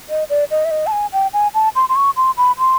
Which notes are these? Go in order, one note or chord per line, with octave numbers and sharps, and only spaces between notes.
D#5
D5
D#5
E5
D#5
A5
G#5
G5
G#5
A5
C6
C6
C#6
C6
B5
C6